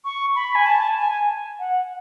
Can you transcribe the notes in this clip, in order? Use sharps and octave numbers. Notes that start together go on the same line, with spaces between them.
C#6
B5
G#5
A5
G#5
F#5